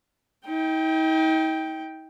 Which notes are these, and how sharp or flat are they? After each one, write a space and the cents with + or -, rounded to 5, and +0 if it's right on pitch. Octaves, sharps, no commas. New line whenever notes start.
D#4 +40 G5 +0